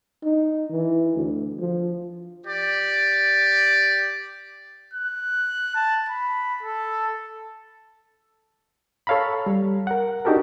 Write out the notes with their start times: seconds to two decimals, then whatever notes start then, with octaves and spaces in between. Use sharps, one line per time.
0.23 D#4
0.70 E3
1.16 D2
1.59 F3
2.46 G4 D5
4.94 F#6
5.75 A5
6.09 B5
6.63 A4
9.07 A4 C#5 F5 A#5 B5
9.46 G3
9.87 A#4 F#5
10.25 D4 D#4 F#4 G4 A4 A#4